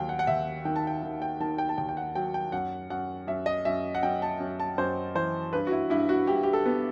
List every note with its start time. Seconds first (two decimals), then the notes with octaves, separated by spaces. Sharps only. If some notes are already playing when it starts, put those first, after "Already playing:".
Already playing: D#2 F#3 G5
0.09 F#5
0.19 F#5
0.27 D#2 E5
0.65 D#3 G5
0.76 A5
0.87 G5
1.03 D#3
1.22 G5
1.40 D#3 A5
1.58 G5
1.69 A5
1.78 D#2 G5
1.89 G5
1.97 F#5
2.15 F#3 G5
2.34 G5
2.52 F#2 F#5
2.90 F#2 F#5
3.27 F#2 E5
3.46 D#5
3.65 F#2 E5
3.95 F#5
4.03 F#2 G5
4.22 A5
4.40 F#2
4.60 A5
4.78 F#2 C5
5.15 E3 C5
5.53 G2 B4
5.67 F#4
5.72 E4
5.90 G2 E4
6.09 F#4
6.27 G2 G4
6.43 G4
6.53 A4
6.65 B3